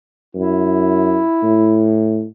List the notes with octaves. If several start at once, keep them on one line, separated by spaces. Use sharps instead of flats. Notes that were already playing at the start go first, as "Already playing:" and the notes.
F#2 E4
A2